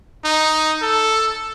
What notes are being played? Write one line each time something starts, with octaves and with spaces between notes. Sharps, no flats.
D#4
A4